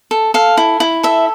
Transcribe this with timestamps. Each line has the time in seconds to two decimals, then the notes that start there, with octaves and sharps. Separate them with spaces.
0.11 A4
0.34 A4 F5
0.57 E4
0.80 E4
1.03 A4 E5